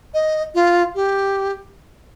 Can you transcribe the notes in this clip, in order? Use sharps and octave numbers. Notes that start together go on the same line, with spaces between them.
D#5
F4
G4